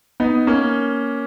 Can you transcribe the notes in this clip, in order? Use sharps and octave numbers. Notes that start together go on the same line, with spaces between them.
B3 D#4
A#3 C#4